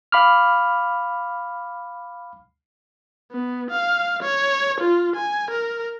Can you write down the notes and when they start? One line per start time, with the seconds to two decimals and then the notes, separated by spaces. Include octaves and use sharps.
0.12 F5 B5 D6 F6
3.32 B3
3.70 F5
4.22 C#5
4.80 F4
5.16 G#5
5.51 A#4